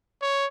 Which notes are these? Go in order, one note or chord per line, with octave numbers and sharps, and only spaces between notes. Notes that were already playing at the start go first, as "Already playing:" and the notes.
C#5